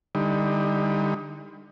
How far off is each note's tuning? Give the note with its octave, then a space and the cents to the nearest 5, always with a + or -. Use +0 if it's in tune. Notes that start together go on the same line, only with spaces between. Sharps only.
D3 +30 G3 +30 D#4 +25